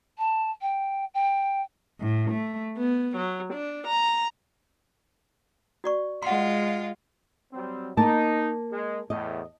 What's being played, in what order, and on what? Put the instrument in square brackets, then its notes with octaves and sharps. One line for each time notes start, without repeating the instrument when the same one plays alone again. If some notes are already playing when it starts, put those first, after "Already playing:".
[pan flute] A5
G5
G5
[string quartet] A2
A3
B3
F#3
D4
A#5
[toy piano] F#4 D5 C#6
[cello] G#3 F4 [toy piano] F#5 C6
[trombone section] F#3 G3 C4
[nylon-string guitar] A#3 A5 [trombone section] D#4
[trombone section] G#3
[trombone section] E2 A2 [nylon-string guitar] D#5